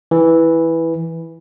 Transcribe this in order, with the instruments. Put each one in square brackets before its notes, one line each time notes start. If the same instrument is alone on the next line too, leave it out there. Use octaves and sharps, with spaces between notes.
[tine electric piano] E3